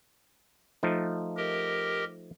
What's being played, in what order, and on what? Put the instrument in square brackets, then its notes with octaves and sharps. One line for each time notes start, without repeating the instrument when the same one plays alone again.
[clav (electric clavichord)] F3 A3 D#4
[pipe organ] G4 A#4 D#5